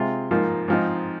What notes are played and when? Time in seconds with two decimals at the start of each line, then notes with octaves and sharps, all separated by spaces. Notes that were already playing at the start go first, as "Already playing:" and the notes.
Already playing: C3 G#3 C4 F4
0.31 G#2 F3 A#3 D#4
0.68 G#2 F3 C4 D#4